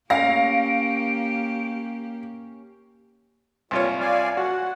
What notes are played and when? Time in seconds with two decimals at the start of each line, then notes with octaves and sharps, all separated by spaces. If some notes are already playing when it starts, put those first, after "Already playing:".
0.10 A#3 C#4 G4 F5 A#6 D7
3.71 C2 A#2 F4 C#5
4.00 D5 F5 G#5
4.37 F#4 F#5